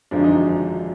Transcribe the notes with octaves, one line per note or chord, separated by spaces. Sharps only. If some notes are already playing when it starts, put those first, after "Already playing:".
G#1 F#2 D3 F3 G#3 D4
D#4
D4